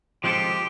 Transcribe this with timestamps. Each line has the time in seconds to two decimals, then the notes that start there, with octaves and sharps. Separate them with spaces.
0.24 F3 G#3 C4 F4 G4 A4